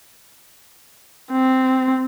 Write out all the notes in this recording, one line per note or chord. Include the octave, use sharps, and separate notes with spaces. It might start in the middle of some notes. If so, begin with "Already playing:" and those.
C4